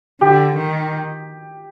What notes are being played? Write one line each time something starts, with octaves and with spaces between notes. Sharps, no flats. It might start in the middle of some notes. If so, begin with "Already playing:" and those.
D3 G4
D#3